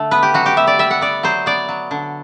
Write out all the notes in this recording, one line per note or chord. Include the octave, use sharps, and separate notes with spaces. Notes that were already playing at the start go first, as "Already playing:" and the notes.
Already playing: D3 A3
B3 B4
G4
F#3 F#4
G4
B3 E5
D5
G3 E5
F#5
B3 D5
F#3 C5
B3 D5
F#3
D3